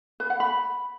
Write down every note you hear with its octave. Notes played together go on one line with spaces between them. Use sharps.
B4
F#5
B5